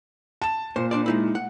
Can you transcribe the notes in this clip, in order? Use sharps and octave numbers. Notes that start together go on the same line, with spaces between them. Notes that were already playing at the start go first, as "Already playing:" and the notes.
A5 E7
A#2 C5
D4 C5 D5
G#3 D#4 E4
F#5